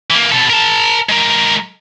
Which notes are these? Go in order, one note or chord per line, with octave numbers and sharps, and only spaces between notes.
E3 A#3
B2 A4
A#4 A5
G#3 A#4